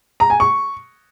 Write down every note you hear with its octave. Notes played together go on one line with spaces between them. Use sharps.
A#5
G#5
C#6